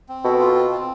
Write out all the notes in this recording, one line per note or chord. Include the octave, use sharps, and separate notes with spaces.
C4
B2 A4
F4
C4
C4